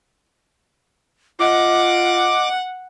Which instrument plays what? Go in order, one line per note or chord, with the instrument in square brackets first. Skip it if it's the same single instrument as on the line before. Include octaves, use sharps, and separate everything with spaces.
[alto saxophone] F4 [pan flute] D#5 [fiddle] F#5 [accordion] D6